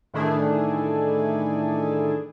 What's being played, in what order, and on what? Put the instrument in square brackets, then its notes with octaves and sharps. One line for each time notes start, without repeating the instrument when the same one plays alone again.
[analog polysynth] A2 D#3 E3 A3 D4 G#4